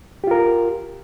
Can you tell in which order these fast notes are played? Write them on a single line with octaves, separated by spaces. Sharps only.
G4 F4 A#4